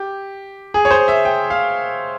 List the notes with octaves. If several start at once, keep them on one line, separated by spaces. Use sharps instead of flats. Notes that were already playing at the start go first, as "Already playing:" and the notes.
Already playing: G4
G#4
C#5
C5
E5
G5
F5